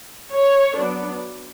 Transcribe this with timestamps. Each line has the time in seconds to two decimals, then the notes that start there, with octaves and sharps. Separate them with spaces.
0.32 C#5
0.76 F#3 B3 D4